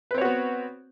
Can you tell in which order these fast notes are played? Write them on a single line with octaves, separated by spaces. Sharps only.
B4 C4 C#5 F#4 B3